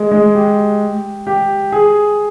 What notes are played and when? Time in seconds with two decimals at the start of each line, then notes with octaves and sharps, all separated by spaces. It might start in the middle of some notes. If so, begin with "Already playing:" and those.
Already playing: G#3
0.11 G#3
0.35 G4
1.27 G4
1.72 G#4